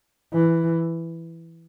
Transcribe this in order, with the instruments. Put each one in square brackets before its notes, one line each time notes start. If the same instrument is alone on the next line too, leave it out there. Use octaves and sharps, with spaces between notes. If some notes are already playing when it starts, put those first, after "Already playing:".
[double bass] E3